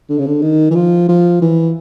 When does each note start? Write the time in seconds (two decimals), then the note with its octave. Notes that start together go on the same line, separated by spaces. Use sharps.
0.10 D3
0.19 C#3
0.26 D3
0.42 D#3
0.71 E3
0.75 F3
1.09 F3
1.42 E3